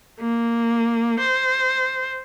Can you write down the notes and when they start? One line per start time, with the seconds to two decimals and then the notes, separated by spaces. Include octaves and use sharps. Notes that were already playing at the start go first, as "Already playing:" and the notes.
0.20 A#3
1.20 C5